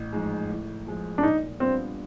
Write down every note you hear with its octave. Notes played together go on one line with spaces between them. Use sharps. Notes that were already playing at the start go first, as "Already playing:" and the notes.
Already playing: A1
G#2 F3 G#3
A2
F3 G#3
D4
A#2 D#4
G3 B3 C4 D4 F4